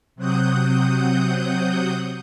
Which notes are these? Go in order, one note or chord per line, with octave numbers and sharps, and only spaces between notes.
C3 F#3 C4 F#5 D#6 G6